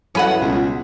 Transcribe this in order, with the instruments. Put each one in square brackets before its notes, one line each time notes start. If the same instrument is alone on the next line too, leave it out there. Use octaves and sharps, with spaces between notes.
[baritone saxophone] E3 [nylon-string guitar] F#3 E4 A4 [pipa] C#4 B4 F#5
[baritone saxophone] C#2 [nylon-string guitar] B2 F4